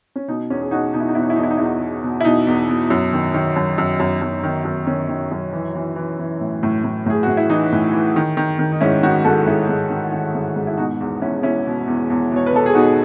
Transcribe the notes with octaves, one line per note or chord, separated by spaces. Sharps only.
C#4
B2 D#4
E2 C#4
G#4
B2 D#4 F#4
B2 D#4
E4
D#4
E2 E4
D#4
E4
E2 D#4
E4
D#4
E2 E4
D#4
B2
B2
E4
B2 D#4
E2
B2
F#2
D#3
D#3
F#2
F#2
F#2
F#2
D#3
F#2
D#3 C#4
D#3
F#2
E3
E3
E3
E3
A2
A2
A2
A2 G#4
A2 F#4
E4
E3 D#4
A2
E3
D#3
D#3
D#3
D#4
G#2 C#4 E4
D#3 D#4 F#4
G#2 F#4 A4
G#2 E4 G#4
G#2
D#3
D#3
G#2
G#2
E4
B2 D#4 F#4
E2
E2 C#4 E4
B2 C#4 E4
B2
E2
E2
B2 C#5
B4
B2 A4
G#4
B2 D#4 F#4